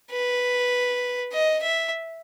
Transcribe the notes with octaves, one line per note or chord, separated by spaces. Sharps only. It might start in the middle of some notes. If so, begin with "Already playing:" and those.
B4
D#5
E5